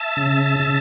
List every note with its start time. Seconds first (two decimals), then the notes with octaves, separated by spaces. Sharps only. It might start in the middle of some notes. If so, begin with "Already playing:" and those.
Already playing: E5 A5
0.17 C#3
0.60 C#3